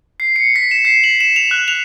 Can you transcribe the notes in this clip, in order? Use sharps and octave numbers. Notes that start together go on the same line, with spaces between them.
C7
C#7
B6
E7
C7
F#7
E7
F7
F#6
F7